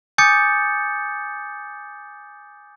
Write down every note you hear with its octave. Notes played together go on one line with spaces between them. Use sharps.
G#5 D6 D#6 G6 A6 C#7